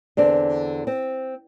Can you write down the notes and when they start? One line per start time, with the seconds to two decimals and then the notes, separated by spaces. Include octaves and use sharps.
0.17 E2 D3 C4 D5
0.87 C4